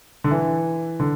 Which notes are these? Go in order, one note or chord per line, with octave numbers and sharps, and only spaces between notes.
D3
E3
D3